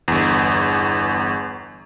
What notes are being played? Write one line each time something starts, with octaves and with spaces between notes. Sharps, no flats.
G1 E2